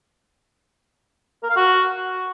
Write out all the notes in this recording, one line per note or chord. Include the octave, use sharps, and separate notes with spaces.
A#4
F5
F#4